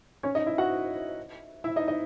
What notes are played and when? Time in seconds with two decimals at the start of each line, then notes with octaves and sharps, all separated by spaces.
0.23 C#4 C#5
0.35 D#4 D#5
0.46 E4 E5
0.58 F#4 F#5
1.64 E4 E5
1.76 D#4 D#5
1.88 D#4 D#5